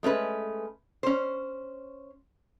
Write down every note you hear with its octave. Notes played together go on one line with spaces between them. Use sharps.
G#3 A3 C#4 B4
C#4 C5